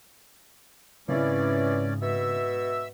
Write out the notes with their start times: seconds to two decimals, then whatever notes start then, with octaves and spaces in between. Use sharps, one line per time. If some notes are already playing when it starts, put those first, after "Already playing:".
1.08 G#2 C#3 E3 C4 C#4 E4 D5
2.02 B2 E5 E6